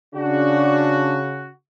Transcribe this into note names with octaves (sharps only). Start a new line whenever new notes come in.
C#3 D4 F#4